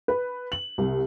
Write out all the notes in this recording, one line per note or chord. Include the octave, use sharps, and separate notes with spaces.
B4
F#7
C2